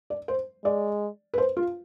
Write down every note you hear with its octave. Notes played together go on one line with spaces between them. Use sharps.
D5
C5
G#3 D5
B4
C5
F4